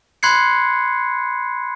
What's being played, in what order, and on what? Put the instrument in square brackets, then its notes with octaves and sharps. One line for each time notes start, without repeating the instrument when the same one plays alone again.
[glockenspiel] B5 C6 F#6 G#6 C7 C#7